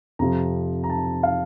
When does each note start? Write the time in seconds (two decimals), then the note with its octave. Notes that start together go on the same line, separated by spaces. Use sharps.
0.19 F2 C3 F3 A#5
0.84 A#5
0.89 A5
1.23 F5